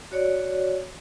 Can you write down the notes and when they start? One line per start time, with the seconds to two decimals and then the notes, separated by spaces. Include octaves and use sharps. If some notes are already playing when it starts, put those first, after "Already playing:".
0.12 F#4 C#5 D5